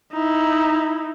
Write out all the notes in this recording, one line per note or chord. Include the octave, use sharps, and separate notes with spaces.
D#4 E4